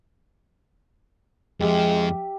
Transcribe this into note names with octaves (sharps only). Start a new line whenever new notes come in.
F2 F3 G#3 G4 E5